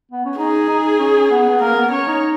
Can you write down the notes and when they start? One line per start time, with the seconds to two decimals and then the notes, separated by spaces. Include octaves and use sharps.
0.12 B3
0.25 C#4
0.38 D#4 G#4
0.68 D#4
0.99 C#4
1.31 B3
1.49 B3
1.60 A#3 A#4
1.76 B3
1.91 C#4 C#5
2.07 D#4